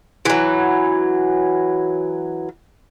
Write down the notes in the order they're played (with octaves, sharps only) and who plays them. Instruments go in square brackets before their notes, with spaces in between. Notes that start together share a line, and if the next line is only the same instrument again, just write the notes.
[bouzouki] E3 F#3